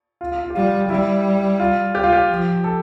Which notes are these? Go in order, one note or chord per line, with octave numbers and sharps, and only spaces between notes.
F4
F4
F4
G4
G3 F4
G3 E4
F4
G4
F4
G4
F3
A4